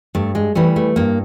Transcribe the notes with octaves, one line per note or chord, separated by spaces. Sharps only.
G2 A3
G#3
E3 G3 A3
A3
G2 A#3